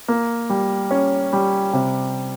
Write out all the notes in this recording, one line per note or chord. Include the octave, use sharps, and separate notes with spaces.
A#3
G3
C#4
G3
C3